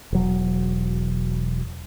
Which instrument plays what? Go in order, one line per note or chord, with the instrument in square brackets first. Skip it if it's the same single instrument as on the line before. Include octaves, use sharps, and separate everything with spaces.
[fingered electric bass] E1 F#3